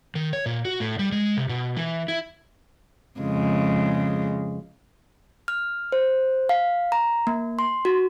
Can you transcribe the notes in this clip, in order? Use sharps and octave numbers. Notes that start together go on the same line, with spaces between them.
D#3
C#5
A#2
F#4
A2
G3
G#3
C3
B2
E3
E4
F2 C#3 G#3
F6
C5
F5
A#5
A#3
C6
F#4